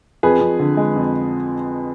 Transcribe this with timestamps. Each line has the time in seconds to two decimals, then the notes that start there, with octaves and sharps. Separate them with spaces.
0.23 F2 G#4 B4
0.41 F2
0.59 D3
0.77 G#3
0.96 F2